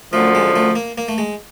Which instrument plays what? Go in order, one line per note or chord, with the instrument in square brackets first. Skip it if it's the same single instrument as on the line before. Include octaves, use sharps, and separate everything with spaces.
[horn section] F#2 D3 F3 [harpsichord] A3
[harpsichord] G#3
A3
A#3
A#3
A3
G#3